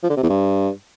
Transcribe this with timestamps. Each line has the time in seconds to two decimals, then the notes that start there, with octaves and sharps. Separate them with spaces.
0.03 F3
0.10 D3
0.16 C3
0.23 E2
0.29 G2